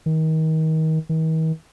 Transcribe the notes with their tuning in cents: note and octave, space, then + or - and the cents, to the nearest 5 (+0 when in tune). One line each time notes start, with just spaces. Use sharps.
D#3 +30
D#3 +45